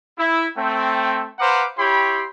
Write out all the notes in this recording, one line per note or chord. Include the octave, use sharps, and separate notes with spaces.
E4
A3 C4 G5
B4 C5 F5 F#5 A#5 D6
E4 G4 C#5 G5 B5 C6